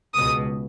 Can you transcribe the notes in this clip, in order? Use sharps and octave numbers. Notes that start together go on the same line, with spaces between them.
C#2 B2 D#6